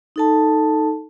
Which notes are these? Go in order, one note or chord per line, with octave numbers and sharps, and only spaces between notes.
D#4 A4 A5